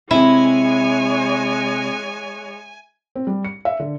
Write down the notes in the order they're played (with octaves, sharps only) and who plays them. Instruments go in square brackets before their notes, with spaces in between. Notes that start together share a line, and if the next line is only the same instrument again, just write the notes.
[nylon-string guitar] C3 [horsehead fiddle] G#3 C#5 [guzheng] E4 [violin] G#5
[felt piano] C4
G3
C#7
E5
D3